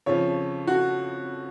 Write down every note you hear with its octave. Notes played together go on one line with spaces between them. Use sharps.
F2 C#3 F3 C#5
F#4